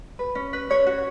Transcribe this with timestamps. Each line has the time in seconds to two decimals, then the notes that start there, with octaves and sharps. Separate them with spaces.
0.19 B4
0.35 C#4
0.53 B4
0.70 C#4 C#5
0.86 F#4